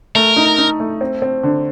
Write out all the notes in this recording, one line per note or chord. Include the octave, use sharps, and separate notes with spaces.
A3 A#4
D#4
D#4
A3
C4
C4
D3